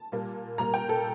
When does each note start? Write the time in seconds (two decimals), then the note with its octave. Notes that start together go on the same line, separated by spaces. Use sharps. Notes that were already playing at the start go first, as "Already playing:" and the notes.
Already playing: A5
0.12 A#2 G3 A#3
0.58 A#2 G3 A#3 A#5
0.74 G5
0.89 A4